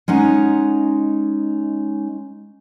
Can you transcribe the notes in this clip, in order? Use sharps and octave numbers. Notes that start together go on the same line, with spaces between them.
G#3 C#4 D#4 F#5